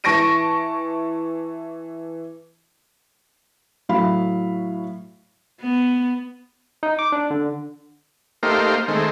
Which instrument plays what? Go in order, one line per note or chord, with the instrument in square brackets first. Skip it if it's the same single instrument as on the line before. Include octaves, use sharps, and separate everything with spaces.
[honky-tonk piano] E3 A5 C#6 A#6 D7 D#7
[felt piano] A2 F#3 F5 B5
[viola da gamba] B3
[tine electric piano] D#4
D6
D4
D3
[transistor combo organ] A3 A#3 D#4 G4 C5 F5
D#3 G#3 A3 C4